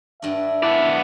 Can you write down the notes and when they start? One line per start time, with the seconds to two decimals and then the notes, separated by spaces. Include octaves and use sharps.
0.22 G2 D4 E5
0.63 B3 E4 D5 F#5 A5